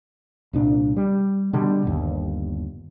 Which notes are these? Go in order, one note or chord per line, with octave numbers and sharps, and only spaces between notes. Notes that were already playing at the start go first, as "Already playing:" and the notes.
C2 A#2 D4
G3
B2 D3 G3
G1 D#2